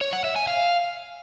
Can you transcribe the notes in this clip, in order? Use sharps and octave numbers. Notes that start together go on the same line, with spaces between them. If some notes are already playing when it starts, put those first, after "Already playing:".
C#5
F#5
E5
G#5
F5